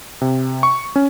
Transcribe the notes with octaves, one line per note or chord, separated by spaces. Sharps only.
C3
C#6
C#4